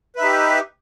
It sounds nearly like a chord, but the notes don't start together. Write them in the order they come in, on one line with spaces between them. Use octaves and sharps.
B4 E5 D#4 G4